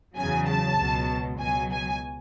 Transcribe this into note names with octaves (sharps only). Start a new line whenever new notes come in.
E2 C#3 F#3 G#5
A5
C#2 B2 F#3
C#2 B2 F#3 G#5
G#5